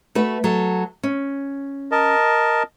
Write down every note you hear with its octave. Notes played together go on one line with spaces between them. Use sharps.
A3 F#4 B4
F#3 A4
C#4
A#4 D#5 A5